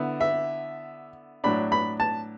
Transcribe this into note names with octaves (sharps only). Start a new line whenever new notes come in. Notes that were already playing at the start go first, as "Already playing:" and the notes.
Already playing: D3 B3 E4
E5
A2 F#3 D4 B5
B5
A5